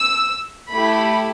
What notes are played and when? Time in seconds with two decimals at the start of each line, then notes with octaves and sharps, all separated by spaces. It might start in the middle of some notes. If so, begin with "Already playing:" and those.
Already playing: E6
0.71 A3 E4 G4 B5